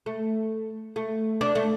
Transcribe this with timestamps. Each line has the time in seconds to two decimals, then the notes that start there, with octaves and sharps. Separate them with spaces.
0.06 A3
0.96 A3
1.41 D4
1.55 A3